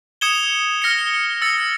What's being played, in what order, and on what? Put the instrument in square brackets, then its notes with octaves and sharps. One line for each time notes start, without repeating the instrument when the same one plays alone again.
[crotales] D#6 G#6 C#7 E7 G7
F6 A#6 C#7
E6 A6 C#7